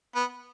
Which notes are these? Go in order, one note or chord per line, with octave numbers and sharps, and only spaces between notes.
B3